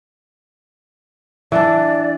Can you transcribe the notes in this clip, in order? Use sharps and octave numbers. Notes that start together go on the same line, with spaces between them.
E3 D4 D5